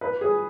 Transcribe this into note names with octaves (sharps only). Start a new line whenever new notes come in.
B4
G#4